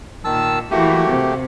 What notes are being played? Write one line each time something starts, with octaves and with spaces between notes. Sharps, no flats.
A#2 D#3 A5 E6
E3 A3 A#3 F#4 G4
C3